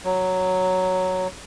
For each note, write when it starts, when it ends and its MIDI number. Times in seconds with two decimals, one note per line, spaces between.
0.04 1.28 54